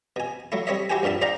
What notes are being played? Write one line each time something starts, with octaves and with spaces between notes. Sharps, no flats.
B2 G#5
F#3 A3 E4
G3 C4 C#5 D#5 E5
E4 F#4 G4 C5 G5 G#5
A#1 G2 A#2 E5 A5
C5 D5 D#5 F5 G5 A#5